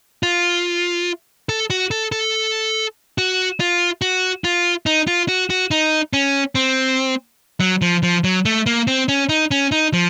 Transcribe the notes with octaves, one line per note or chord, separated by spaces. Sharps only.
F4
A4
F#4
A4
A4
F#4
F4
F#4
F4
D#4
F4
F#4
F#4
D#4
C#4
C4
F#3
F3
F3
F#3
A3
A#3
C4
C#4
D#4
C#4
D#4
F3